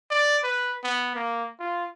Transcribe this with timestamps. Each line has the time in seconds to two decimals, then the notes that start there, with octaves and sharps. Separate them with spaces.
0.10 D5
0.43 B4
0.84 B3
1.16 A#3
1.60 F4